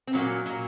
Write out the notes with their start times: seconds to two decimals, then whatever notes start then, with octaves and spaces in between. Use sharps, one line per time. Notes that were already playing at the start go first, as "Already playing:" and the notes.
0.07 C4
0.13 A#2 F#3 A#3 C#4
0.46 A#2 F#3 A#3